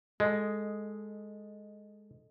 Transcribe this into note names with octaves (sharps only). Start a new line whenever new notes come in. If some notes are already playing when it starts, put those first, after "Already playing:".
G#3 A4 D#5